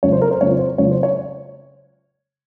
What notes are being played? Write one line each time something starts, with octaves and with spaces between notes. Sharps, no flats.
C#3 F#3 C4 F4 C#5
C5
A#4
C5
C#3 F#3 C4 F4 C#5
C5
C#3 F#3 C4 F4 C#5
C5
C#5